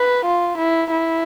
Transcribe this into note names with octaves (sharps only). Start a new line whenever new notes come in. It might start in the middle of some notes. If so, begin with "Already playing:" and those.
Already playing: B4
F4
E4
E4